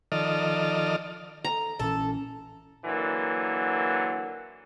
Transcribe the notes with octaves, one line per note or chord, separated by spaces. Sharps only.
D#3 F3 A4 D5 D#5 F6
A4 A#5
A#1 A#2 E3 C#4 A4
D3 E3 F#3 A#3